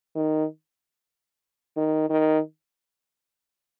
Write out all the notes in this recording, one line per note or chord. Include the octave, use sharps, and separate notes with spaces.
D#3
D#3
D#3